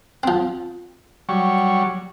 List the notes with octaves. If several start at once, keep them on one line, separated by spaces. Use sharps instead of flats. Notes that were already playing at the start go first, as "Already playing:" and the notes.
F3 C4
F#3 G3 C#6